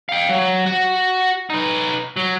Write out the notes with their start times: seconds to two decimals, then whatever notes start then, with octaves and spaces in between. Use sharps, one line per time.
0.09 F5 G5
0.29 F#3
0.66 F#4
1.50 D#4 B4
2.17 F#3